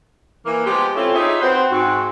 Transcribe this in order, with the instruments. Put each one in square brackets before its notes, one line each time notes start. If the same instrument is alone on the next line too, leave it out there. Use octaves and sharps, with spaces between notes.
[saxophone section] E3 A#3
F3 G#3 B3 G4
C4 C#4 E4 F4 A4 C#5
D#4 F4 G4 G#4 C#5 E5
C4 F#4 B4 C5
G#2 C4 F#4